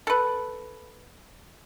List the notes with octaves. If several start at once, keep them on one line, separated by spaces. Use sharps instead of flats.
A4 B4